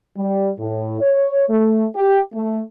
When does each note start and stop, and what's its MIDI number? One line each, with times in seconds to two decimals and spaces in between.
0.17 0.50 55
0.59 1.00 45
1.01 1.45 73
1.49 1.85 57
1.95 2.20 67
2.33 2.61 57